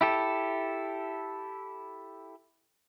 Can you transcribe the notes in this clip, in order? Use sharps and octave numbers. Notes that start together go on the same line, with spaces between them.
E4 G4 A4